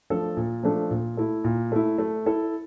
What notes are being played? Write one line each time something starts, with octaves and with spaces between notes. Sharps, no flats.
F3 A3 D4 A4
A#2
F3 A3 D4 A4
A#2
A3 E4
A#2
A3 E4
A3
E4 A4